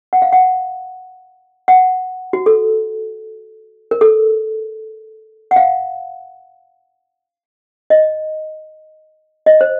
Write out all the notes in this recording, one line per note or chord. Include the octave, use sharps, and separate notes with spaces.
F#5
F5
F#5
F#5
F#4
A4
A#4
A4
F#5
F5
D#5
D#5
C5